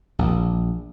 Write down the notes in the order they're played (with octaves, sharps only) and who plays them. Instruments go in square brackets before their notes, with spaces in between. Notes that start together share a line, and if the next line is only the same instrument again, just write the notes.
[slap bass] A#1